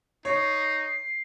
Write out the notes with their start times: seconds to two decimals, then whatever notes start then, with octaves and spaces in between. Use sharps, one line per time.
0.25 D#4 C#5 C7